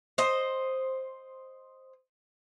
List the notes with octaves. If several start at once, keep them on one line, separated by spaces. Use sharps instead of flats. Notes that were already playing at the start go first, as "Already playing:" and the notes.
C5 D#5